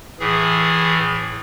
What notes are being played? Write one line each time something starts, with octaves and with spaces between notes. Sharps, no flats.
A2 E3 G#4